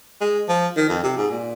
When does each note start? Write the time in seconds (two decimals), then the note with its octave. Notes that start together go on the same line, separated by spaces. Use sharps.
0.21 G#3
0.48 F3
0.76 D#3
0.89 F2
1.04 C3
1.17 G#2
1.31 A#2